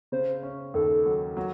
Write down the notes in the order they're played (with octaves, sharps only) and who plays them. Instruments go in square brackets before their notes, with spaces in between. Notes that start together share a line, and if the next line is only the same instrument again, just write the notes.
[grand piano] C#3 [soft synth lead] C5
[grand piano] C#4
[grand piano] D#2 [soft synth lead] A4
[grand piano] F#3
F#3